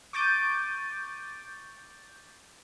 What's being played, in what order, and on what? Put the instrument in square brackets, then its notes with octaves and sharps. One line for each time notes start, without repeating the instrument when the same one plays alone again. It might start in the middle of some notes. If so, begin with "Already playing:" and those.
[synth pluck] C#6 D6 G6 A6 D7 D#7